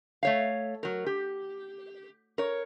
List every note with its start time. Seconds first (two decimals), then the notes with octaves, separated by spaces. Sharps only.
0.23 A3 C#5 F5
0.83 F#3 A#4
1.06 G4
2.38 A#4 C#5